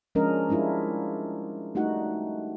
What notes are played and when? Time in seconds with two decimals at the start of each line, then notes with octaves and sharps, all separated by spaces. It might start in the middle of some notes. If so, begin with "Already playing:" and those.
0.15 F3 G#3 C#4 D4 A#4 D#5
0.49 G3 G#3 D4 E4 F4
1.75 G3 A3 D#4 F#4 F#5